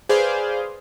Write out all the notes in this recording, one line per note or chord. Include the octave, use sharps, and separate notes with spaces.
G#4 B4 C5 D5 F5